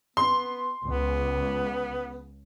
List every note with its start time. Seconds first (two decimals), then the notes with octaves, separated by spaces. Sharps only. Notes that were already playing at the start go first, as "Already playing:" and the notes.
0.17 B3 C6
0.86 C#2 B3